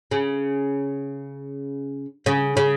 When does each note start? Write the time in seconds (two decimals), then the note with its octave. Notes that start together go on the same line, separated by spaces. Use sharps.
0.11 C#3
2.26 C#3
2.57 C#3